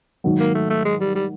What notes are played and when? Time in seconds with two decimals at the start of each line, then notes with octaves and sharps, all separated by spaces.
0.24 G#2 D#3 F#3
0.40 A#3
0.55 A3
0.70 A3
0.85 G#3
1.00 G3
1.15 G3